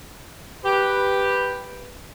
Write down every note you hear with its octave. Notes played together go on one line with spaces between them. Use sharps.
G4 B4